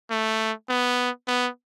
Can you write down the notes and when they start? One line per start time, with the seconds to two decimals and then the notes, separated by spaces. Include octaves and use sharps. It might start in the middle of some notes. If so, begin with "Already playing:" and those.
0.11 A3
0.69 B3
1.28 B3